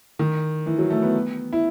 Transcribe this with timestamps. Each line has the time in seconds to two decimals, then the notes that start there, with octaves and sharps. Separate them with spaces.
0.19 D#3
0.66 E3
0.79 F#3
0.90 A3
1.02 B3
1.53 E4